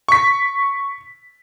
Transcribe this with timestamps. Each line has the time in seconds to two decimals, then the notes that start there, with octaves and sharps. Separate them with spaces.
0.09 C#6 B6